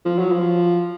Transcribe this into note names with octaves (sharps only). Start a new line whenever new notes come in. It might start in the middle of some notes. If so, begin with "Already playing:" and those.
F3
F#3
F3